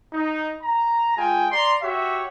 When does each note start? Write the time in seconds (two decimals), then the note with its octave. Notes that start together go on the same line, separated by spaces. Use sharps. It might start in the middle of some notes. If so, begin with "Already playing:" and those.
0.13 D#4
0.63 A#5
1.18 G#3 F4 G5 G#5
1.52 D5 A#5 C6
1.82 F#4 G4 C#5 E5